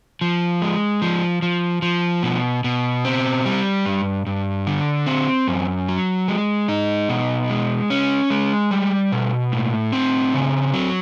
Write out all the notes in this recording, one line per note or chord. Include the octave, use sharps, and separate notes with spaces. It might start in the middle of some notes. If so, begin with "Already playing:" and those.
F3
G#3
F3
F3
F3
B2
B2
C4
G3
G2
G2
D3
C4
F#2
F#3
G#3
D#4
B2
G#3
C#4
G#3
G3
B2
A2
C4
C#3
F#3